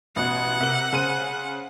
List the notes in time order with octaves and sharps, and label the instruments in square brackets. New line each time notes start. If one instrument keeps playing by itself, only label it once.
[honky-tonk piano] A1 B2 [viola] F#5
[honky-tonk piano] C3 A#4 F#7
C#3 C5 D#7